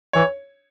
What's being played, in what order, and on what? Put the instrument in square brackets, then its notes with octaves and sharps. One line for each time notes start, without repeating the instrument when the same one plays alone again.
[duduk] E3 [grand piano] C#5